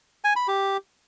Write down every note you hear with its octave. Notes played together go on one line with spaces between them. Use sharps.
G#5
B5
G4